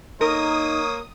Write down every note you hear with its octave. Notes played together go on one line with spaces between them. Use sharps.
A#3 D#4 A#4 C#5 D#6